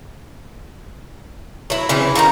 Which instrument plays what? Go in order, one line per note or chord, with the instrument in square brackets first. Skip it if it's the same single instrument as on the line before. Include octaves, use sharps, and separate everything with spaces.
[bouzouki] F#3 E4
C#3 E3 C4 E4
D#3 D#4 F#4 A#4